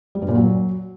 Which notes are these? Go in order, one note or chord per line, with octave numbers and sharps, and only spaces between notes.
G3
G2
A#2
F#3